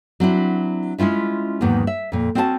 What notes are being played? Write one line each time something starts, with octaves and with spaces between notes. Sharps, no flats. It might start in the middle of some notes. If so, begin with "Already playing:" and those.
F#3 C4 D4 E4
G#3 C#4 E4 F4 E5
E2 G#2 D#3 F#3 A#3 B3
E5
F2 A#2
C4 C#4 F#4 E5 A5